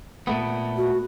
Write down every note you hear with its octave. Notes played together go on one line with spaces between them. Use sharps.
A#2 A3 B3
F#4